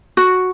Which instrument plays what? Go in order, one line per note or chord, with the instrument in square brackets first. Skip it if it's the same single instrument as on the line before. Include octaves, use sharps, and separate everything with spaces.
[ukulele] F#4